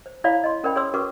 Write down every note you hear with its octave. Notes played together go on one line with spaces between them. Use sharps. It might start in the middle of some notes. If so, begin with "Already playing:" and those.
C5
E4 C#5 D5 F5 B5
D#5 C6
C#4 A#4 C5 D5 G5 B5
G#4 C#5 D5 C6 D#6 E6
C#4 F#4 A#4 B4 C#6 D6